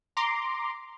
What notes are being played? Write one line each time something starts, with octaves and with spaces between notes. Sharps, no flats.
A#5 C6 D6